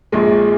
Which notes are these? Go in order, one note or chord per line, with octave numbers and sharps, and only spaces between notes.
A#1 A#2 F3 G#3